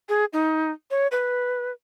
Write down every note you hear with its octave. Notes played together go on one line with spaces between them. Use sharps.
G#4
D#4
C#5
B4